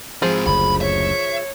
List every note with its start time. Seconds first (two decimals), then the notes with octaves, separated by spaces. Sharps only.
0.22 G#2 F3 C4 G#4
0.47 F#1 D2 B5
0.81 C#5 E5